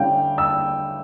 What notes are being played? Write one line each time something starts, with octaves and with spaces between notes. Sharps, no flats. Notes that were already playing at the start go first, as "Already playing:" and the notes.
Already playing: D3 G3 C#4 E4 F5 G5
E6